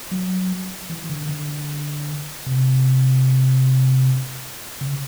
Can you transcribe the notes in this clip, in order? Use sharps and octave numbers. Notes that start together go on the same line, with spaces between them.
F#3
E3
D3
D3
C3
C#3